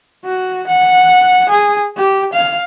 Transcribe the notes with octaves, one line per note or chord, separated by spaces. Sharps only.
F#4
F#5
G#4
G4
F5